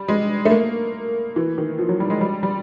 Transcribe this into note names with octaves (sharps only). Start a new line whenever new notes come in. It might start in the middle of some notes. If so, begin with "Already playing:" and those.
Already playing: G3
G#3
A3
A#3
E3
D#3
F3
F#3
G3
G#3
G3
G3